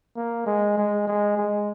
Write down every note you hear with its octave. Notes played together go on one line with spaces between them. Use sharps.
A#3
G#3
G#3
G#3
G#3